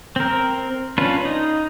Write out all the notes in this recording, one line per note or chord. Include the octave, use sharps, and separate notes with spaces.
C4 A#4
C#4 D4 F4 B4
D#4